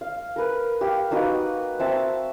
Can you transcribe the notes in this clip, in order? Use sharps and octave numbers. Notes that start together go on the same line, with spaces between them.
F5
A#4 B4
G4 F5
A#3 D#4 F#4 B4
C4 E5 A5